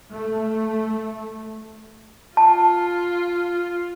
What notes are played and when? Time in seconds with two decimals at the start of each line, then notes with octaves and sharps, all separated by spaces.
0.11 A3
2.37 F4 A5